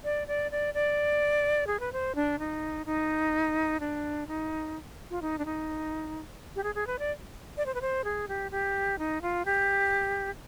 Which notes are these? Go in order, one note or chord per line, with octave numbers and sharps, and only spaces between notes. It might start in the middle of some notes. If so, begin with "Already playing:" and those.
D5
D5
D5
D5
G#4
B4
C5
D4
D#4
D#4
D4
D#4
F4
D#4
D4
D#4
G4
G#4
G#4
B4
D5
D5
C5
B4
C5
G#4
G4
G4
D#4
F4
G4